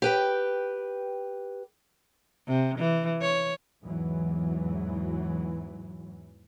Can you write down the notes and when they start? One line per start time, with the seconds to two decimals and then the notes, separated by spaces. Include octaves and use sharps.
0.02 G4 B4 G5
2.48 C3
2.79 E3
3.22 C#5
3.83 E2 G#2 E3 F#3